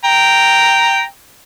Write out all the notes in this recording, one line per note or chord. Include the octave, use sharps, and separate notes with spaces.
G5 A#5